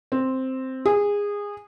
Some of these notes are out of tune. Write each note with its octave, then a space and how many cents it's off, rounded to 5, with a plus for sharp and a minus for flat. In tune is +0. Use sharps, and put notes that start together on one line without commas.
C4 +0
G#4 -20